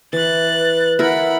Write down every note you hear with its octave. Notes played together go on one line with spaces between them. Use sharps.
E3 F#6 A6
B4
E4 A#4 F#5 B5